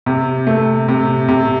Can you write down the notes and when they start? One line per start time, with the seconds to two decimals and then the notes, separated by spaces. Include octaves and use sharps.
0.06 C3
0.47 A3
0.88 C3
1.29 C3